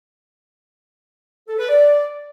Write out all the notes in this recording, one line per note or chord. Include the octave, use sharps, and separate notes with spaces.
A4
B4
D5